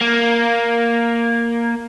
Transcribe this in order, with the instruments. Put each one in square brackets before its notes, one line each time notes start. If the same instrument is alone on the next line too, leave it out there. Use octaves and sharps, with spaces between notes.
[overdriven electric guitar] A#3